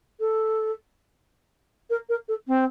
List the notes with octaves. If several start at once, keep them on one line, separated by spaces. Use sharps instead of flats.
A4
A#4
A#4
A4
C4